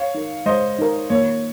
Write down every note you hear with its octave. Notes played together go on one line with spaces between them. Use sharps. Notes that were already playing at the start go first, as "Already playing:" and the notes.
Already playing: C#5 F5
D#4 A#4
G#3 C5 D#5
D#4 A#4
A#3 C#5